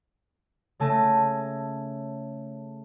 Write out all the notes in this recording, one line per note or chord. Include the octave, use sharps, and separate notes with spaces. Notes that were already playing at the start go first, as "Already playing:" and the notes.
C#3 A3 G#5 A5 A#6 D#7